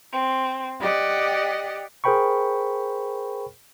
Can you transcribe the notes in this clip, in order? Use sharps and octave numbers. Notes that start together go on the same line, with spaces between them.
C4
G4 D5 D#5 F#5
G#4 A#4 C5 G5 B5 C#6